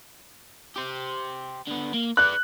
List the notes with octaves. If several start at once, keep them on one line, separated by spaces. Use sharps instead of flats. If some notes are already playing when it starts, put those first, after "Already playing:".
G4 C5
D3 B3
A#3
B4 D5 F#6